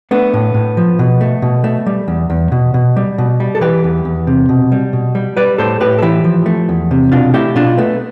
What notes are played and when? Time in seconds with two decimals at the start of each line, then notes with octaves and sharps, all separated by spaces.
0.11 A3 B3 D4
0.34 A2
0.54 A2
0.77 F3
0.99 B2
1.21 A3
1.42 B2
1.64 A3
1.86 G3
2.08 E2
2.30 E2
2.52 B2
2.74 B2
2.96 G3
3.18 B2
3.40 G3
3.55 A4
3.61 E3 G4 B4
3.84 E2
4.05 E2
4.27 C3
4.49 B2
4.72 G3
4.93 B2
5.15 G3
5.37 G3 B4 D5
5.58 A2 A4 C5
5.80 A2 G4 B4
5.99 A4
6.02 E3 E4 G4
6.24 F3
6.46 A3
6.69 E2
6.91 C3
7.12 B2 D4 F4
7.34 A3 E4 G4
7.55 B2 D4 F4
7.78 A3 B3